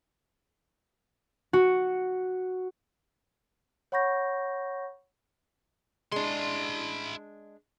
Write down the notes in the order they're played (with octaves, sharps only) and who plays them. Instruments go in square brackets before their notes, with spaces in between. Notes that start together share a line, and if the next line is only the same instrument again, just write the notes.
[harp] F#4
[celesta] C#5 F#5 B5 C#6 G6 A#6
[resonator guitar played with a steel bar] G#3 D4 [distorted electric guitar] E4 C6